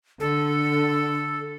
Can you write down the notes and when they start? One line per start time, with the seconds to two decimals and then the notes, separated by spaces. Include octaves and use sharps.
0.20 D3 A4